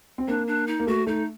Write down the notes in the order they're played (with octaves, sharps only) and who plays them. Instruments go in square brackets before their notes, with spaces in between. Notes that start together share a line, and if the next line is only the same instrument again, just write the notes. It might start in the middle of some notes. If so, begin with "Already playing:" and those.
[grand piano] C4
[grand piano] A#3 [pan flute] D4
[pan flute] D4
D#4
[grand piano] A#3
[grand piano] A3 [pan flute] F#4
[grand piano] A3 [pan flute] D#4